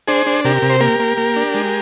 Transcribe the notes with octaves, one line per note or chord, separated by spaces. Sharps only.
D4 G#4 C5
D4
C3 G4 A#4
C3
C5
A#3 G4 A#4
A#3
A#3
D4
G#3